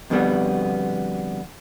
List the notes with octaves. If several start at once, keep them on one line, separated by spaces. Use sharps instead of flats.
F2 B2 D3 G3 B3